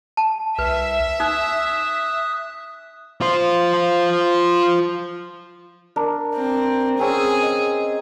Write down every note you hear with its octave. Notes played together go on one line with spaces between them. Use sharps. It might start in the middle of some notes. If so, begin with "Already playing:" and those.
A5
C2 B4 E5
D#4 D#6 F#6
F4 C5
D4 A#4
C4
C4 C#4 G#4 E6
D#5